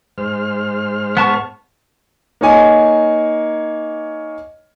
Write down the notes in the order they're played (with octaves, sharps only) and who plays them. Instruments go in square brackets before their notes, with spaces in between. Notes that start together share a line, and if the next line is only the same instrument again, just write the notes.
[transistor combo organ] G#2 C5 F6
[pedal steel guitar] B3 A5 C#6
[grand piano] A#3 D#4 C#5 G#5